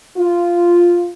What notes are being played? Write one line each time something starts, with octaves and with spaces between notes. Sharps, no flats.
F4